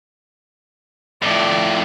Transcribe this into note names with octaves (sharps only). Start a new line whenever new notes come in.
F2 A2 D5 E5